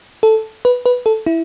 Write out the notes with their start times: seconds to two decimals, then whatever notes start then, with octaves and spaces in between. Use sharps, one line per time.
0.23 A4
0.65 B4
0.86 B4
1.06 A4
1.26 E4